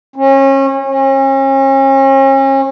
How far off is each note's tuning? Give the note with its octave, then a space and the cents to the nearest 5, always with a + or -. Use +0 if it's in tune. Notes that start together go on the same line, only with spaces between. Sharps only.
C#4 -30
C#4 -40